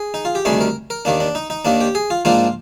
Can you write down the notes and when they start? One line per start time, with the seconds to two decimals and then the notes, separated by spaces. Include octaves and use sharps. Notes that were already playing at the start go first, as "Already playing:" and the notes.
Already playing: G#4
0.14 D#4
0.25 F4
0.35 G4
0.45 D2 C3 D#3 G3 D4 G#4
0.61 A#4
0.90 A#4
1.05 D#2 D#3 A#3 D4
1.20 D4
1.35 D#4
1.50 D#4
1.65 D#2 D#3 A#3 D4
1.81 G4
1.95 G#4
2.10 F4
2.25 G#2 F3 A#3 D4 F4